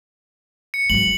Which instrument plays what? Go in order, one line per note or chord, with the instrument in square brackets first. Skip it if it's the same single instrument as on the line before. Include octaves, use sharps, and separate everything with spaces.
[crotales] C#7
[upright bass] G#2 F#3 [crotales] F#7